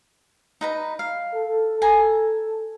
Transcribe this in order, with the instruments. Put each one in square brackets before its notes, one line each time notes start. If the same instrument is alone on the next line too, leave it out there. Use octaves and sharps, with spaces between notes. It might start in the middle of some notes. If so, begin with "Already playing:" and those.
[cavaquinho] D#4 B4 A#5
F5
[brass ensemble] A4
[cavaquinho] G#5 A#5